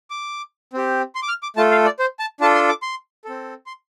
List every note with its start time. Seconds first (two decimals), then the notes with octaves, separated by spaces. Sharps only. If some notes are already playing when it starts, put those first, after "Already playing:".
0.10 D6
0.73 C4 G4
1.15 C6
1.23 D6
1.28 F6
1.43 D6
1.57 A3 F4 A4 A5
1.72 F5
1.85 D5
1.99 C5
2.19 A5
2.40 D4 F4 A4 A5
2.55 C6
2.69 D6
2.82 C6
3.25 C4 A4
3.66 C6